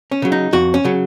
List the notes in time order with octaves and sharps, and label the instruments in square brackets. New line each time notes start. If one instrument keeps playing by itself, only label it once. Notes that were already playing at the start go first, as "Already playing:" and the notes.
[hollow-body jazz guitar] C#4
C#3 F#3
D#4
F2 F#4
C#4
C#3 F#3